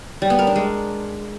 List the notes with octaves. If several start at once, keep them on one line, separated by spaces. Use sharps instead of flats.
G3
B3
A#4
D4
G#3